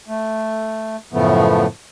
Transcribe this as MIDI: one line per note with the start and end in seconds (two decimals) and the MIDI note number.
0.08 0.96 57
1.13 1.66 42
1.13 1.66 45
1.13 1.66 49
1.13 1.66 53
1.13 1.66 57
1.13 1.66 59